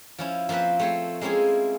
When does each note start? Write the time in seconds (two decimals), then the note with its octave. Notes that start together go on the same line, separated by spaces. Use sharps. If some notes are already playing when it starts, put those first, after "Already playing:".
0.19 F3 C#4 E4
0.49 F3 A#3 C4 B4 E5
0.80 A3 C4 C#5
1.21 G#3 A#3 C4 C#4 E4 G#4